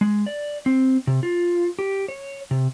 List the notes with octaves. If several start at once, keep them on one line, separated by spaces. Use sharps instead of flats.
G#3
D5
C4
C3
F4
G4
C#5
C3